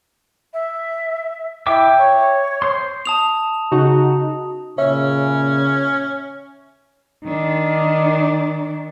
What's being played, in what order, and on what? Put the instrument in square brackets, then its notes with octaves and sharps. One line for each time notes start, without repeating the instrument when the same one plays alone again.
[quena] E5
[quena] E4 [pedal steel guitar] E5 G5 D6
[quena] C#5
[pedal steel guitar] C5 C6
[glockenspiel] A5 D#6 F7
[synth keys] C#3 D#4 F#4
[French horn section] A#2 C#3 [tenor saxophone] C#4 [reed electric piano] C#5 E5
[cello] D#3 D4